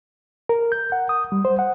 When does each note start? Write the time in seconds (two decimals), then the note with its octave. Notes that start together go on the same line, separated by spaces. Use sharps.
0.49 A#4
0.72 G6
0.92 F#5
1.09 D#6
1.32 G3
1.45 C5
1.59 F#5